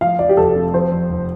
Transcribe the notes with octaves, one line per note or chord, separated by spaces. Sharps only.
F3 F5
F2 D5
G4
F1 A4
C4
F3 C5
F2
F1